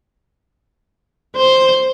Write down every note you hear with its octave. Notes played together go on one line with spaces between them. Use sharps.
C5